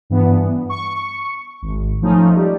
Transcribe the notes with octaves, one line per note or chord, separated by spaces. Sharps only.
G2 E3 B3
C#6
G#1
F3 A3 C#4 D#4
G3